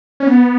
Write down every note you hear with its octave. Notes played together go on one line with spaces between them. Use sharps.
C#4
B3